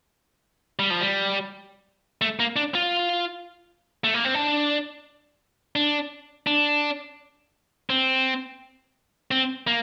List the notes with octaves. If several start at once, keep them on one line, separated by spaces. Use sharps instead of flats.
G3
F3
G3
A3
A#3
D4
F4
A3
A#3
C4
D4
D4
D4
C4
C4
A#3